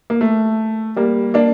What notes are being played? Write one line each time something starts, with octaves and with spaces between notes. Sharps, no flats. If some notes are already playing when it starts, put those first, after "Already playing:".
A#3
A3
G3 A#3
A#3 D4